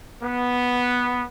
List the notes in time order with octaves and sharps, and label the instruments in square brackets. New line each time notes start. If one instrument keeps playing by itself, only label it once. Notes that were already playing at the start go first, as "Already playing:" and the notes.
[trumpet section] B3